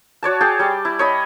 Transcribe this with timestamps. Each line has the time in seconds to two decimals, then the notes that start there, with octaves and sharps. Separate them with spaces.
0.23 F#4 C#5 D5 A5
0.41 G#4 G5 A5
0.59 G3 D5
0.85 E4
0.99 C#5 D#5 B5